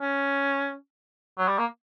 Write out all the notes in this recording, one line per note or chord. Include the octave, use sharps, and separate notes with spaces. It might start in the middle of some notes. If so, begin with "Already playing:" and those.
C#4
F#3
G3
A#3